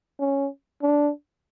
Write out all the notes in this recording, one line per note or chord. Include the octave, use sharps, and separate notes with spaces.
C#4
D4